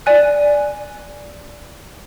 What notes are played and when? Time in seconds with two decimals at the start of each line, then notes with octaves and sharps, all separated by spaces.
0.06 D5 G#5 F#6